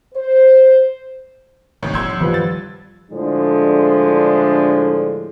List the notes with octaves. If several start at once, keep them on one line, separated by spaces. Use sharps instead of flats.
C5
C2 G#2 D#3 A#3 C#5
C2 F3 C6 E6 G6 G#6
G2 D#3 F3 B4
A6
A2 D3 F3 G#3 D4